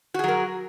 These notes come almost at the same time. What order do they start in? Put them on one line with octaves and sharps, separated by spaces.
F#4 G#4 F#3 A#4